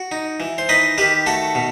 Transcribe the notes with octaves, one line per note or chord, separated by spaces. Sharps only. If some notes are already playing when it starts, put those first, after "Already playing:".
Already playing: F#4
D#4
E3
C5
D#4 B4 D#5
D#3 G4 B4
A3 F#4 A4
B2